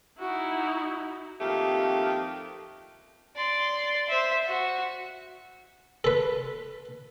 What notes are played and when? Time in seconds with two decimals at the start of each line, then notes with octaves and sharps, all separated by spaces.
0.20 D#4 E4 F#4
1.41 F2 D#3 A3 A#3 G4
3.36 D5 C6
4.09 C5 E5
4.48 F#4
6.04 A4 B4